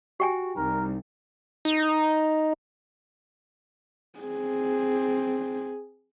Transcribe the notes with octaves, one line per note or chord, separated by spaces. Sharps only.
F#4 G4 G5 G#5
C2 D#4 A#4
D#4
C4 G#4